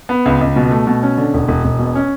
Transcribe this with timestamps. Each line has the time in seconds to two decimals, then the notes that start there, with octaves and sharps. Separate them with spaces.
0.09 B3
0.26 C#2
0.41 C#2
0.56 B2
0.71 A3
0.87 B2
1.03 C#4
1.18 D3
1.34 E1
1.48 E1
1.64 E1
1.79 B2
1.95 C#4